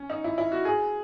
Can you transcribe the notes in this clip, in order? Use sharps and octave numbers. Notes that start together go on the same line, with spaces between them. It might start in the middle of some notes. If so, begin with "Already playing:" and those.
Already playing: C#4
D#4
E4
E4
F#4
G#4